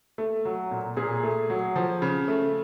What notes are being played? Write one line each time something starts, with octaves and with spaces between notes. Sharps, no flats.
A3
F#3
A#2
A#2 G#4
A3
F#3
F3
C#3
A3